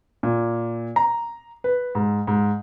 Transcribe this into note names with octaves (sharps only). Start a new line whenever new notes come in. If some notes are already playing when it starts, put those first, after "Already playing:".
A#2
A#5
B4
G#2
G#2